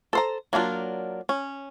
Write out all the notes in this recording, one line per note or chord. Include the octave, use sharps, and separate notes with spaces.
A4 C5 A#5
F#3 A#3 D4 F4
C#4